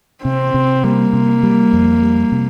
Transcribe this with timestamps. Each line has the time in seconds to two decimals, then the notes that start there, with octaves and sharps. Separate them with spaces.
0.24 C3 C4
0.54 C3
0.84 G3 A#3
1.13 C3
1.43 G3
1.73 F2
2.02 G3
2.32 C3